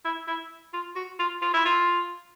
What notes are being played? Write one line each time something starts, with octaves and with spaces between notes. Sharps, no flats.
E4
E4
F4
F#4
F4
F4
E4
F4